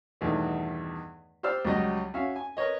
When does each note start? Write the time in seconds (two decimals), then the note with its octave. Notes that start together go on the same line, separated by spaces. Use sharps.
0.21 E2 G2 B2 D#3 A3 B3
1.43 G4 C5 D5 E6 F6
1.65 C#2 F#3 G3 D#5
2.14 C#4 F#4 E5 F5
2.36 G#5
2.57 A#4 B4 C#5 D#5